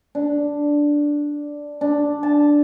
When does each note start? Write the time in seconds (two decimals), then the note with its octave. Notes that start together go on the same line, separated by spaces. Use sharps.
0.15 D4
1.81 D4
2.23 A5